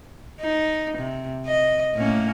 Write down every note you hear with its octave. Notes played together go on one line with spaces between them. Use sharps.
D#4
C3
D#5
A2 A#3 C#4